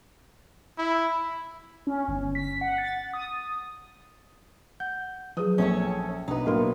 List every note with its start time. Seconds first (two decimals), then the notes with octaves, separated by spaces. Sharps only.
0.78 E4
1.87 C#4
2.08 G1
2.35 B6
2.61 F#5
2.78 A6
3.14 D#6
4.80 F#5 G6
5.37 F3 F#3 G#4 B4 D#6
5.58 A#1 C#4 A4 C#5
6.28 B1 B2 B3 D4 D#4 B4
6.46 A2 F#3 A#3 D4 A#4 C6